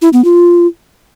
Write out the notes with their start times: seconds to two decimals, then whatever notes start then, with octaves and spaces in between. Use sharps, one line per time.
0.02 E4
0.13 B3
0.25 F4